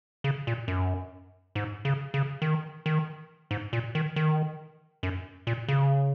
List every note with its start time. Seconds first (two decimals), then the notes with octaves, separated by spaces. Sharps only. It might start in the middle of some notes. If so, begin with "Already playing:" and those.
0.24 C#3
0.47 A#2
0.68 F#2
1.55 G#2
1.85 C#3
2.14 C#3
2.42 D#3
2.86 D#3
3.51 G#2
3.73 A#2
3.95 D#3
4.16 D#3
5.03 F#2
5.47 A#2
5.68 C#3